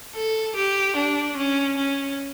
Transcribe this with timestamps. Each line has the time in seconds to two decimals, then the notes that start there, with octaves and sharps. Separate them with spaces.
0.15 A4
0.56 G4
0.96 D4
1.37 C#4
1.77 C#4